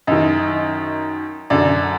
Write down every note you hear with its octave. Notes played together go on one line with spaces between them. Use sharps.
F#2 D#3 D#5
F#2 D3 D5